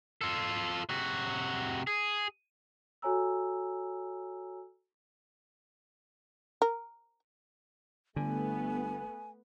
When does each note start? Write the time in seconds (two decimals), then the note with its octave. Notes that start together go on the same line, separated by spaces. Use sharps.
0.21 F4 A4
0.89 C3 F#4
1.87 G#4
3.02 F#4 A4 C#5 G#5 A#5 E6
6.62 A#4
8.16 G1 D3 A3 B3 G#5